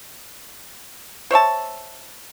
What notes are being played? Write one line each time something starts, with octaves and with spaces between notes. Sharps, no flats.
C5 C#5 E5 A5